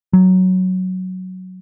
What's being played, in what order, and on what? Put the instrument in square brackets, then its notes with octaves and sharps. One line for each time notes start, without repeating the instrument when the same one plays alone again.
[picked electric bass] F#3